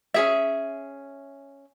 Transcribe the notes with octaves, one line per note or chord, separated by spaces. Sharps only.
C#4 G#4 E5